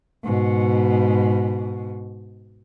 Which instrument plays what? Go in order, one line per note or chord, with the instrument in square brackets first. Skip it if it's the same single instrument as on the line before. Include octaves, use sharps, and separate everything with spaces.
[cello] G#2 B2